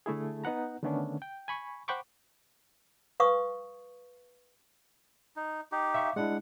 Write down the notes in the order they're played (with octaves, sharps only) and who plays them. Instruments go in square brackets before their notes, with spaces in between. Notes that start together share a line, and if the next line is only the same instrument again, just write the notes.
[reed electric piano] D3 A3 E4 G#4
B3 D#4 B4 F#5 A#5
D3 D#3 A3 B3 C#4 D4
G5
G#5 B5 C#6
C5 F#5 G5 B5 C#6 D6
[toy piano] B4 F5 C#6 D#6
[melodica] D#4
D#4 G4
[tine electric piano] E5 F5 C#6
[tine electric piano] G#3 D4 E4 [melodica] F#5